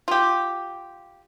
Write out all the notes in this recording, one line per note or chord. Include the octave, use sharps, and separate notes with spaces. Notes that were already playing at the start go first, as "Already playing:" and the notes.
F4 G4